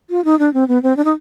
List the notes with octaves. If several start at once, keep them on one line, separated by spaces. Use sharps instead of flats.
F4
D#4
D4
C4
B3
C4
D4
D#4